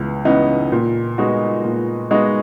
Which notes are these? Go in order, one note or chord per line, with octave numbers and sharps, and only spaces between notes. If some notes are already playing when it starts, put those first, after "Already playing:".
Already playing: C#2 E3 B3
C#3 E3 B3 D#4
A#2
G#3 B3 D#4 F#4
A#2
G#3 B3 D#4 F#4